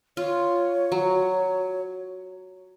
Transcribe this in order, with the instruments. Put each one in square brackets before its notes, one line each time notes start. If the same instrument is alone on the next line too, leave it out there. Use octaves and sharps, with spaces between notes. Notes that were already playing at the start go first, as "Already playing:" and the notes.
[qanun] F4 [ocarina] C#5
[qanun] F#3